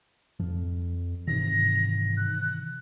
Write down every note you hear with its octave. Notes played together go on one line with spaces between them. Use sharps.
F2 F3
G#2 C3 D#3 E3 A#6
F#6